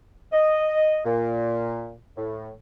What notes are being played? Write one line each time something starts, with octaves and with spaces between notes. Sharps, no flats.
D#5
A#2
A2